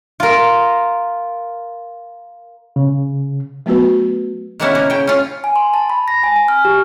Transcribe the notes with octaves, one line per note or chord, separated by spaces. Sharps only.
F4 A#4
C#3
F#3 A3 B3 F#4 B4
D#3 G#3 A#3 B3 C#4 E4
C#3 A#3
C#3 G5
C#4 F4
G#5
C6
A5
B5
A#6
G#5
G#5
F6
G4